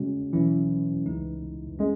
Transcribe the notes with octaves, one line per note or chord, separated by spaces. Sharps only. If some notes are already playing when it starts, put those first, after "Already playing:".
Already playing: C#3 G#3 C#4 F#4
B2 E3 F#3 C#4 E4
C#2 C#3 G#3 D#4
G#3 C#4